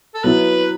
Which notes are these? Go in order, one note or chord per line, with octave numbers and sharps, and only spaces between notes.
A4
F#3 B3 E4 B4